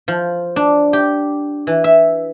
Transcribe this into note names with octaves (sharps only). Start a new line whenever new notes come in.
F3
D4
G4
E3
E5